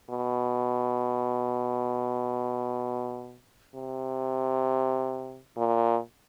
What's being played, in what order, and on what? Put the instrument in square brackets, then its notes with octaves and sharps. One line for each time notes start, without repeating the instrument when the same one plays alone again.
[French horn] B2
C3
A#2